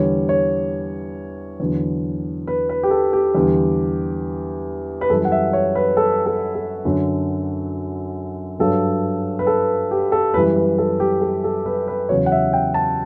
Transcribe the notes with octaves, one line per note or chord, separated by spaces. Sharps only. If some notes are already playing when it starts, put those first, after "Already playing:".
Already playing: E2 D3 G3 C#5
C#5
E2 D3 F#3
B4
B4
G4
A4
G4
E2 D3 G3
B4
F#2 E3 G3 A4
F#5
E5
C#5
B4
A4
A4
A4
F#2 D3 F#3
G2 F#3 A4
B4
A4
G4
A4
F#2 E3 G3 B4
B4
A4
G4
A4
A4
B4
B4
E2 C#3 F#3 C#5
F#5
E5
G5
A5